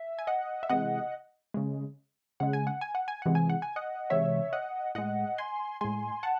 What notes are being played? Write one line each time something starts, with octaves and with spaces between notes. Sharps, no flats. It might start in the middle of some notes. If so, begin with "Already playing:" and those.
Already playing: E5
G#5
D#5 F#5
E5
C3 E3 G#3 D#5 F#5
C#3 G#3
C#3 G#3 F#5
G#5
F#5
G#5
F#5
G#5
C3 E3 G#3 F#5
G#5
F#5
G#5
D#5 F#5
C3 E3 G#3 C#5 E5
D#5 F#5
A2 G#3 D#5 F#5
G#5 C6
A2 G#3 G#5 C6
F#5 A5